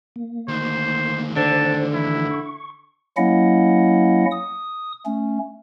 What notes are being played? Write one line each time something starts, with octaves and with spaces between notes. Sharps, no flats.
A#3
D2 D#3 C5
D3 C5 A5
E3 E4
C#6
F#3 A#3 C#4 E4 D#5 F#5
D#6
A3 C#4